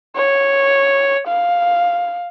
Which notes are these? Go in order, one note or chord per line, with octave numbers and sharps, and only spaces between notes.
C#5
F5